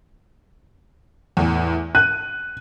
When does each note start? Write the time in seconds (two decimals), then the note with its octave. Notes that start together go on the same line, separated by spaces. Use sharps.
1.37 E2 A2 E3
1.95 F#6 D#7